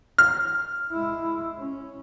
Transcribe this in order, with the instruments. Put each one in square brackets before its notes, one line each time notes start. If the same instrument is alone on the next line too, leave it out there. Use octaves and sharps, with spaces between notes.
[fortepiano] F6
[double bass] G#3 E4
C#4